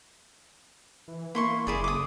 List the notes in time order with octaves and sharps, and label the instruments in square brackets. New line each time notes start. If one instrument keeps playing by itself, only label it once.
[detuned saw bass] E3
[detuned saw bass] A#3 [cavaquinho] E4 C6 C#6
[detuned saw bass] F#1 [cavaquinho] E4 G#4 D5
[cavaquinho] D6 D#6